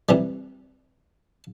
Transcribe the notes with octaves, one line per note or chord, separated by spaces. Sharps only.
C3 E3 G3